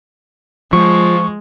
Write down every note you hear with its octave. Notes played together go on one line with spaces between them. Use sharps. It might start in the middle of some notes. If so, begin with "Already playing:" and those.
F3 G#3 C#6